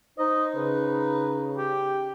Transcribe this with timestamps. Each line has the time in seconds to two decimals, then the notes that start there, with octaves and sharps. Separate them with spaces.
0.18 D#4 C5 D#5
0.55 C#3 B4
1.58 G4